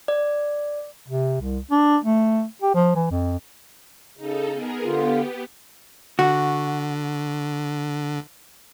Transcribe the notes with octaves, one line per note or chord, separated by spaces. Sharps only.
D5
C3
C2
D4
A3
G4
F3
E3
F2
C#3 D#4 A4
B3 G#4 A#4
D3 B3 F4 G4
D3 F#4